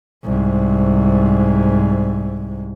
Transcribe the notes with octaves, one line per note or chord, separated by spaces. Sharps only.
C2 G#2